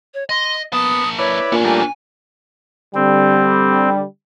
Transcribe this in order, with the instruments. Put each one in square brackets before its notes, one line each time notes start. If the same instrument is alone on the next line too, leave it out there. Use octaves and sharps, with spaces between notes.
[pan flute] C#5
[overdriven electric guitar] D#5 [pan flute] C6
[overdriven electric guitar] A#3 A5 [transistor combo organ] B3 [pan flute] D#6
[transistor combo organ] E4 B4 D5 [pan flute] C#5
[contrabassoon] A#2 [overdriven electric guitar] C#4 D4
[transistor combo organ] G3 A3 A#3 [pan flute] G#5
[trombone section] D3 G3 [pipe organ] C4